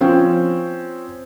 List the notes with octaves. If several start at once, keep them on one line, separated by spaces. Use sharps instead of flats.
F3 C4 C#4